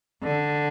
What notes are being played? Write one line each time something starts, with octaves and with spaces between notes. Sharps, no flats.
D3